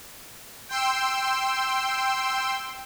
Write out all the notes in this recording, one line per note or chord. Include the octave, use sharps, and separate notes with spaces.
G5 C6 E6